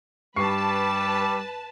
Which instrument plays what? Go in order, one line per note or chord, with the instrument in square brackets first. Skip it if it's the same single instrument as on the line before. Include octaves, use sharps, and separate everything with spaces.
[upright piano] G2 C#6 C7 [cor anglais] G3 [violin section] B4 A5